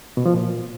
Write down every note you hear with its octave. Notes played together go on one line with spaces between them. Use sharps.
B2
F3
A#2